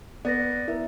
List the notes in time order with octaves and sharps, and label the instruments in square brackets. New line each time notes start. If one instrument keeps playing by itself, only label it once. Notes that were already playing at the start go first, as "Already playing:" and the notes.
[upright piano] B3 [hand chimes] D5 A6 A#6
[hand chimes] E4 A#4 E5